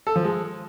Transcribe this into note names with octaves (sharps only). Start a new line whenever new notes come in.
A4
F3
G#3